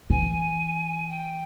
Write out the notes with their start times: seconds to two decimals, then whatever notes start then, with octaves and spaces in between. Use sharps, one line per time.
0.10 E3 G#5
1.09 G5